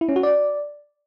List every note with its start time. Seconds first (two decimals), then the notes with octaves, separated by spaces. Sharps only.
0.01 E4
0.09 C#4
0.16 F#4
0.23 D5